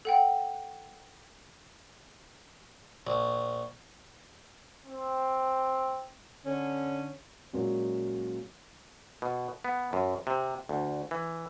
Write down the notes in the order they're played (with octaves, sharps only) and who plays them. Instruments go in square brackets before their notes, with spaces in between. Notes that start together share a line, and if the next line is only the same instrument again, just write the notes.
[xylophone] A4 F#5 G5
[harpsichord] A#1
[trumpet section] C4
[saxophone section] D3 C#4
[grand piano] A#2 F#3 G#3 C#4 F#4
[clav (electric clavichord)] B2
B3
F#2
C3
D2
E3